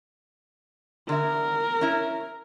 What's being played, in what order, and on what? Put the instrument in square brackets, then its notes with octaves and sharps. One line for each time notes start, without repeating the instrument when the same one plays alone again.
[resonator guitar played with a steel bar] D3 E5 [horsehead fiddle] A#4
[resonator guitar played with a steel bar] C#4 E4